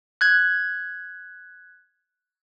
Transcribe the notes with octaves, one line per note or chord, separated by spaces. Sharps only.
F#6 G#6